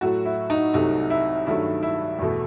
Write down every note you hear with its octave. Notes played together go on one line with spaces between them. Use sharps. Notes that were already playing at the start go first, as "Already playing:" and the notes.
A2 F#3 A3 F#4
E4
D#4
C2 C3 F#3 A3 D#4
E4
G2 D#3 F#3 A3 E4
E4
E2 B2 A3